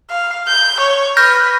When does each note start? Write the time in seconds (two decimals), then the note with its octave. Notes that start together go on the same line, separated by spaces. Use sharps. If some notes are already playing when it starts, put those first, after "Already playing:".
0.10 F5
0.48 G6
0.80 C#5
1.17 B4 F6 G6 A#6